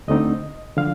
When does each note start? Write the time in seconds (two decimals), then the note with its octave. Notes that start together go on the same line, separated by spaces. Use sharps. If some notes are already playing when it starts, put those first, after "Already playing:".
0.08 D2 D3 A3 C4 D#4 D#5
0.77 D3 F3 F5